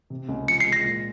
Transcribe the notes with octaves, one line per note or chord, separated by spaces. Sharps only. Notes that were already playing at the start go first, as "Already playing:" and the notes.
C3
C#2
F3 C#7
C7
G#3
A#6
A#2